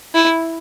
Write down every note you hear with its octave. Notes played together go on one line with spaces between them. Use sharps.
E4